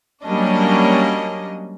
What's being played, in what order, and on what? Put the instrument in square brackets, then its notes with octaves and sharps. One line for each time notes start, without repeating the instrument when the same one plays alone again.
[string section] F#3 G3 A#3 C#4 D4 D#5